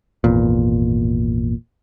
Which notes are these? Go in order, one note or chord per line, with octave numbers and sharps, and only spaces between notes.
G#1 E2 A#2